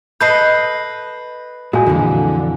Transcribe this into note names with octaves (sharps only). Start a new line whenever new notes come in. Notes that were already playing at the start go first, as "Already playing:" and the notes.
A4 B4 D#5 G6 C7
A#2 G#3 F#4 G#5
F2 A#2 D3 E3